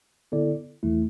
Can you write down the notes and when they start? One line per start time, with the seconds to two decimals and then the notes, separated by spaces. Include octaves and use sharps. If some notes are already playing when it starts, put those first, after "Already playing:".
0.32 D3 B3 E4 A4 D5
0.83 E2 E3 A3 E4